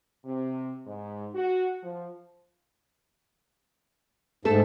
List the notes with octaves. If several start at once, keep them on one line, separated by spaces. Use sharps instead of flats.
C3
G#2
F#4
F3
G#2 A3 A4